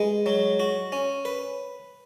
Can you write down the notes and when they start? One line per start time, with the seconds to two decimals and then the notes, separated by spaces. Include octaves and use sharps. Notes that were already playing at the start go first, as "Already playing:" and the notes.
Already playing: G#3 B4
0.26 F#3
0.60 F#4
0.92 C#4
1.25 B4